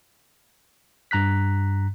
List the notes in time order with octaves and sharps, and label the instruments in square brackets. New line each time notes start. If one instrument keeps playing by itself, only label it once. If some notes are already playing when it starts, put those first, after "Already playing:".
[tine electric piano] G2 A#5 F#6 B6